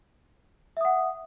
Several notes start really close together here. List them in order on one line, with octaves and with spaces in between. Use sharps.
E5 D#6 F#5